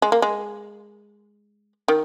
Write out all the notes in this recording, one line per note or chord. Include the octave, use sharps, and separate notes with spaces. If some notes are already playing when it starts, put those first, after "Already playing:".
G#3
A#3
G#3
D#3